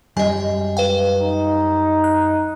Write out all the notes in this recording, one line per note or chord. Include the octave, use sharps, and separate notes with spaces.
F#2 G3 G#3 D#5 G#5
B4 F5 G5
D#4
F#6